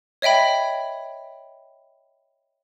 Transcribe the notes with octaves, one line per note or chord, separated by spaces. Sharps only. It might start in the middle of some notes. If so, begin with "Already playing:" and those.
C#5 D#5 E5 G5 B5